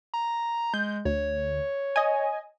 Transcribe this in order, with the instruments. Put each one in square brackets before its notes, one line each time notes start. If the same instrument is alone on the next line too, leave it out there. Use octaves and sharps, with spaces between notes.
[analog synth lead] A#5
[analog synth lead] G#3 [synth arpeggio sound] G6
[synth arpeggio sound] D2 [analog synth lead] C#5
[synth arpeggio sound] D#5 G#5